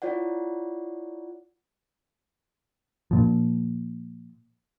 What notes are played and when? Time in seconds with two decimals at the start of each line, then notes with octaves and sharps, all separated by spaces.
0.02 E4 F4 C#5 D5 F#5
3.11 A#2 F3